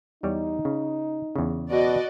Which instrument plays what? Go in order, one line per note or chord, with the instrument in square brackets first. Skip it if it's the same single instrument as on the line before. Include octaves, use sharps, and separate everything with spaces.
[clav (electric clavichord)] E2 G3 C#5 [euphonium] D#4
[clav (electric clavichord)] C#3
E2 C#3
[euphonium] B2 [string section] F#4 D5 D#5